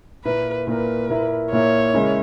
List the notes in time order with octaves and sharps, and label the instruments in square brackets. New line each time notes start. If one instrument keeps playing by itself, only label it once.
[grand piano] A#2 A#3 E4 A#4 [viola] B4
[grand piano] A#2 A#3 E4 A#4 [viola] B4
[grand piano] A#2 A#3 E4 A#4
[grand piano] A#2 A#3 E4 A#4 [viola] C#5
[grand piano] C#3 G#3 C#4 E4 A#4